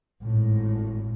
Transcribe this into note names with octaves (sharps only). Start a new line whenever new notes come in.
G#1 A2